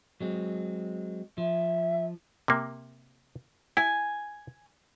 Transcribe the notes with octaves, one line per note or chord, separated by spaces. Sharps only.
F#3 G#3 C4
F3 E5
C3 A#3
E4 G#5